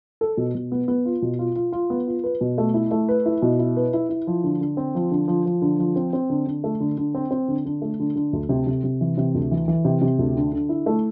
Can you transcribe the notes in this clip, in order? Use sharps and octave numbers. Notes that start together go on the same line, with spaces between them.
A4
B2
B2
B3
B3
F4
B2
F4
F4
F4
B3
F4
B4
B2
A3
E4
A3
B4
E4
B2
E4
B4
E4
E4
F3
D3
D3
C4
F3
D3
F3
F3
D3
F3
C4
C4
D3
D3
A3
D3
D3
C4
C4
D3
D3
A3
D3
D3
D2
C3
C3
C3
E3
C3
D2
E3
E3
C3
C3
D2
D3
D3
E4
A3